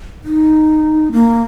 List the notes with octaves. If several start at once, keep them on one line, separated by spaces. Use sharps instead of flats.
D#4
A#3